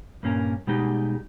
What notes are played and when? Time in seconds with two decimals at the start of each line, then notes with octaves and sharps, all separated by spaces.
0.23 G2 A#2 A#3 C#4 G#4 A#4
0.67 B2 G3 G#3 D#4 G4